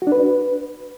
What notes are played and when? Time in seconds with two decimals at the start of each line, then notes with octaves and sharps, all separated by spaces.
0.02 F#4
0.07 D4
0.12 B4